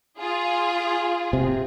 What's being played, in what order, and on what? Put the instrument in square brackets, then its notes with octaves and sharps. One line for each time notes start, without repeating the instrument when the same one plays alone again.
[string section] F4 G#4
[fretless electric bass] C3